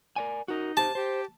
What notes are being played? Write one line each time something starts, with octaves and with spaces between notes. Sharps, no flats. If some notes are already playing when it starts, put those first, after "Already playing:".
A#4 D5 G#5
D#4 F#4 A#4
G4 C5 A5
G4 C5